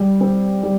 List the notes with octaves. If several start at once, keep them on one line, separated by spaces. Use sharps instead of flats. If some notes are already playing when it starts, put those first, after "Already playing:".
Already playing: G3
C4 G4
G3